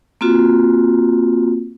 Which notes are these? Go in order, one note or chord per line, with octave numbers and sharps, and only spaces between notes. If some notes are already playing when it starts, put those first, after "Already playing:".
A#3 C4 F4 F#4